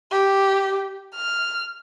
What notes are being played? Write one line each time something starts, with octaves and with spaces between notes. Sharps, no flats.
G4
F6